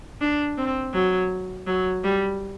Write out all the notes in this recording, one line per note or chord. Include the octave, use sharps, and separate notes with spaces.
D4
C4
F#3
F#3
G3